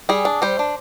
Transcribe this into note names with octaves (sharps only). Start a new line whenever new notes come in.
G3 G#4
D4
G3 C5
D4